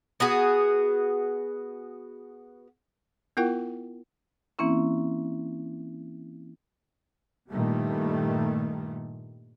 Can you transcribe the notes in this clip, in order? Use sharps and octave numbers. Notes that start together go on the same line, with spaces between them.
B3 F#4 G#4
B3 E4 F4 A#4 F#5 G5
E3 A#3 C4 C#4 E4
G2 A#2 D#3 G3 A3